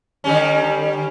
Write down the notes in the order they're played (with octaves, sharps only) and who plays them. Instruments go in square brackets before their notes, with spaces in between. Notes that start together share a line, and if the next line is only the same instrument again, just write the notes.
[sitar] D3 G3 C#4